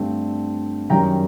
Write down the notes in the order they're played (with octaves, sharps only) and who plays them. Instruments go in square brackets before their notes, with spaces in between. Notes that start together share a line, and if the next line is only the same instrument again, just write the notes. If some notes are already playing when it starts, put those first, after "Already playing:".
Already playing: [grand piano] G2 D3 A3 C4
F#2 D#3 G3 G5 A#5